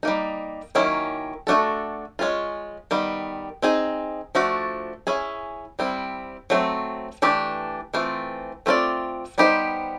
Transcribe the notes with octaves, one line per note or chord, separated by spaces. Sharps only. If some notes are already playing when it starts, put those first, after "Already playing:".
G3 A#3 D#4
D#3 F#3 A#3 C#4 E4
A3 D4 F#4 A4
G#3 C#4 F4
D#3 G3 B3
C4 D#4 G#4
F3 A3 D4 F#4
C#4 E4 G#4
G3 C4 E4
F#3 A3 C4
E3 A3 D4 G4
E3 A3 C4 F4
A3 C4 F4 A#4 D5
G3 B3 D#4 G4 C5